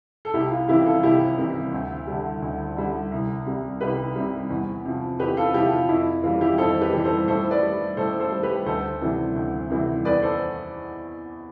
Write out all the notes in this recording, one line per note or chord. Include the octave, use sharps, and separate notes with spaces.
A4
C2 E4 G4
F4
C3 E3 G3 E4 G4
F4 A4
C2 E4 G4
C3 E3 G3
D2
D3 G3
D2
D3 G3
C2
C3 G3
C2 G4 B4
C3 G3
E2
C3 F3
E2 G4 B4
F4 A4
C3 F3 E4 G4
F4
F2 E4
E3 G3 F4
E4 G4
F2 A4 C5
G4 B4
E3 G3
A4 C5
A2 A4 C5
B4 D5
G3
A2 A4 C5
A4 C5
G3
G4 B4
D2 A4 C5
C3 E3 G3
D2
C3 E3 G3
E2 B4 D5
A4 C5